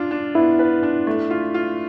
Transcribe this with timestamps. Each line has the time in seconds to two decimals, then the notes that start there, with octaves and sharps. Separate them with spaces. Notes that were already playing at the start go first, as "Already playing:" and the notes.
Already playing: D4 F4
0.11 D4
0.35 B3 E4
0.59 B4
0.83 D4
1.07 A3
1.30 F4
1.54 F4